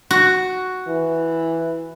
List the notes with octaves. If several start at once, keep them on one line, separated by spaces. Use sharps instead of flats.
F#4
E3